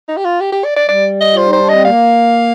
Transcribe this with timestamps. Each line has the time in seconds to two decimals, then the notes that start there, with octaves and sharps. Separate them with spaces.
0.09 D#4
0.17 G4
0.24 F4
0.40 G4
0.52 G4
0.64 D5
0.76 D5
0.89 G3 D5
1.21 D#5
1.34 F4 C5
1.46 D#4
1.53 C5
1.59 D4
1.69 C4 D#5
1.85 A#3 F5